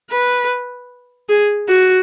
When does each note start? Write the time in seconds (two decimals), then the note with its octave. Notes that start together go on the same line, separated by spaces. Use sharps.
0.11 B4
1.29 G#4
1.68 F#4